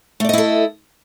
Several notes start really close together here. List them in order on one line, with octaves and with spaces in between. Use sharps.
A3 D5 D#5 E4 A4